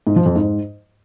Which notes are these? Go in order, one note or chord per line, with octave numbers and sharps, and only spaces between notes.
G#2
F3
F2
G#2